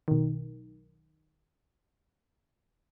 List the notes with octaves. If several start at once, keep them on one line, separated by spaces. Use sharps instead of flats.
B1 D#3